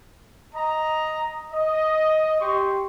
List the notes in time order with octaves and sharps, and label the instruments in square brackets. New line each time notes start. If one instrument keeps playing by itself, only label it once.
[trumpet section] D#5 A#5
D#5
G4 C6 C#6